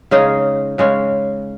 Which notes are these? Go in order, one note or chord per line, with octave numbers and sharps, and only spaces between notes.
C#3 G#3 C#4 D#4 G#4
C#3 G#3 C#4